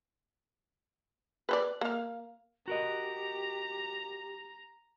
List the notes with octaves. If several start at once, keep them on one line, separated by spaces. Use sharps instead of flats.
B4 C5 D5
A#3 F5
F#4 G4 A#4 D#5 A#5